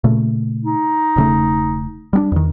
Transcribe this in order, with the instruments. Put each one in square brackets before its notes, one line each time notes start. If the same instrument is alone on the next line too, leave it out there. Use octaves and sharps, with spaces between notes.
[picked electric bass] A#2 C#3 A3
[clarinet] D#4
[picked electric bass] E1 C#3 A3
G3 B3 D4
E2 D#3